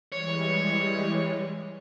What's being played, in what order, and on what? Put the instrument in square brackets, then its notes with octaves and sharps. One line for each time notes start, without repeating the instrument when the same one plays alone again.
[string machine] E3 G3 G#3 [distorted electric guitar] C#5